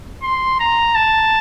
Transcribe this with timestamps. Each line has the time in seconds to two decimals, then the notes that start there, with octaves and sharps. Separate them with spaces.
0.23 C6
0.60 A#5
0.95 A5